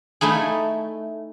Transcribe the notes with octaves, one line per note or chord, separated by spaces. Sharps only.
A3 D#4 E4 G#4